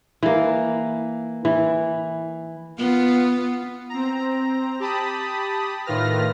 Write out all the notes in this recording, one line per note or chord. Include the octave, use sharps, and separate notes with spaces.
E3 A#3
E3
B3 F4
C4 A#5
G4 A5 B5 D#6
A2 D#3 F4 B4 F6 A#6